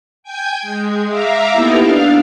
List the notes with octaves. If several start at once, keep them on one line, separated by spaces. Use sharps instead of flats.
G5 G#5 G6 G#6
G#3
E5 F5 A#5 D6
A#3 B3 D#4 E4 G4 A4
D4 F5